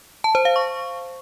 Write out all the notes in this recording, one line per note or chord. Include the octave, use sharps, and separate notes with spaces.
A5
C5
F5
C#6